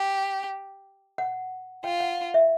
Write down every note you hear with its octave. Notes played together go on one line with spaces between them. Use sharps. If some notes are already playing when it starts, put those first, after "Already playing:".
Already playing: G4
F#5
F4 G5
F#5
E5